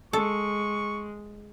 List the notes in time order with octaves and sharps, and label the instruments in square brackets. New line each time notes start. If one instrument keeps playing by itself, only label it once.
[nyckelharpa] G#3 [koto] A4 [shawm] C#6